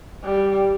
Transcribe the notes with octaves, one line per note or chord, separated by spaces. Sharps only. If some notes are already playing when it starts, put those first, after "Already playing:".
G3